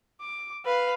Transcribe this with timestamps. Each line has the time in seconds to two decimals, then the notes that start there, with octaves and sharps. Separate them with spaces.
0.21 D6
0.65 B4 F5